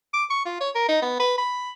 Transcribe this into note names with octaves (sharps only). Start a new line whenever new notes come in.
D6
C#6
F4
C#5
A#4
D#4
B3
B4
B5